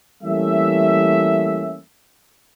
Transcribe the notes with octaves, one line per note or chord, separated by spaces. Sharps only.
E3 G3 A3 A#3 C#4 E5